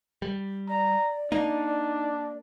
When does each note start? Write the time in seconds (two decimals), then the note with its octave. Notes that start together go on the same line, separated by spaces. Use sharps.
0.22 G3
0.69 D5 A#5
1.32 A#3 D4 D#4